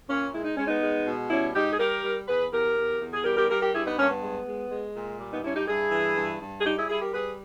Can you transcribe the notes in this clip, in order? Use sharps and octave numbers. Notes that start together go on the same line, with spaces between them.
A#2 A#3 C#4
G#3 E4
D#4
G#3 C#4
B3 D#4
G#3
B2
G3 C#4 E4
G#2 D#4 G4
G#4
G3 G4 A#4
G3
E2 G#4 B4
E2 G4 A#4
E2
E2
G#4
G3 G4 A#4
G4 A#4
G3 G4 A#4
G4 A#4
G2 E4 G#4
B3 D#4
G2 A#3 C#4
B3
G#3
G#3
G#3
A#2
G3
B3 D#4
G2 C#4 E4
D#4 G4
G2 E4 G#4
E3
G2
G2
G#4
G3 D#4 G4
E4 G#4
G3 E4 G#4
G4 A#4
G3 G#4 B4